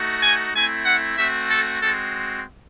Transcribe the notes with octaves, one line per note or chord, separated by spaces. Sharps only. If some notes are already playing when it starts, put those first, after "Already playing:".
Already playing: A3 D#4 F#4
G#5
A3 C4 E4 G#5
F#5
A3 C4 F#4 E5
A4
G#3 C4 F#4 A4